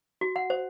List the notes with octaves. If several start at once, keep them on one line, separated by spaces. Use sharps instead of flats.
F#4
F#5
C5